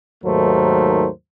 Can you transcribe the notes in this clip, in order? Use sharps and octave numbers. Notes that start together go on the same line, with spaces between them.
D#2 G#2 F#3 A3 A#4 C5